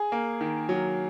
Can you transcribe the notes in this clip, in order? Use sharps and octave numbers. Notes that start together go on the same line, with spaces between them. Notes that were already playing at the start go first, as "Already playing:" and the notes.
Already playing: G#4
A#3
D#3
F#3